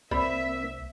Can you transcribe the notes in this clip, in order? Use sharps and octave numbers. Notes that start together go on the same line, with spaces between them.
C2 A#3 C4 C5 D5 E5 B5